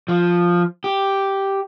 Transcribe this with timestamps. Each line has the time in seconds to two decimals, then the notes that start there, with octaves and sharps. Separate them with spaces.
0.08 F3
0.84 G4